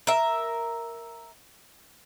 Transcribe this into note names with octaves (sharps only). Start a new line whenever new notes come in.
A#4 E5